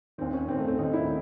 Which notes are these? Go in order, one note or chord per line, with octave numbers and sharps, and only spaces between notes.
D#2 D#3 C4
C#4
D#2 D#3 C4
A3
C4
D#2 D#3 D#4
E4